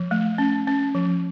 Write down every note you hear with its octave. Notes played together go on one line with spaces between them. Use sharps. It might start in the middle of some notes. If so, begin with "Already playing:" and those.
Already playing: F3
A3
C#4
C#4
F3